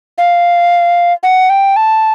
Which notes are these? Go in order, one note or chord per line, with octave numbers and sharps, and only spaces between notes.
F5
F#5
G5
A5